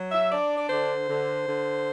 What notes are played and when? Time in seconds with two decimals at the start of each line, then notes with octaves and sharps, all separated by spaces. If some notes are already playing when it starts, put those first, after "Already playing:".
Already playing: F#3
0.12 E5
0.30 D4 D5
0.57 D5
0.68 D3 C5
1.07 D3
1.45 D3